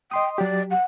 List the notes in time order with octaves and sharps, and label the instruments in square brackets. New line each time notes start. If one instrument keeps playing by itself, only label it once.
[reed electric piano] D#5 C6 D#6 [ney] G5
[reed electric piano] F#3 G4 [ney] D5
[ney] F#5